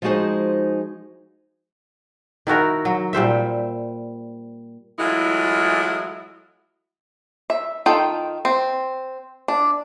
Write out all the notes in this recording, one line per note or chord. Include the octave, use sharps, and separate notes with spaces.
F3 G#3 D#4 F#4 G#4 C5
D#3 E4 F#4 A#4
F#3
A#2 G3 C5 E5
E3 F#3 G#3 A3 E4 F4
E5
D#3 F4 A4 G5
C4
D4